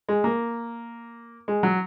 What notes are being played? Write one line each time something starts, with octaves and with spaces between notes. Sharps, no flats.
G#3
A#3
G#3
F#3